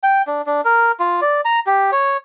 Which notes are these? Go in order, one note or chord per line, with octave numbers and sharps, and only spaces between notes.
G5
D4
D4
A#4
F4
D5
A#5
G4
C#5